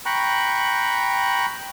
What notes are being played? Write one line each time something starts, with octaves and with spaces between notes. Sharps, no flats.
G5 A#5 B5 C#6 F#6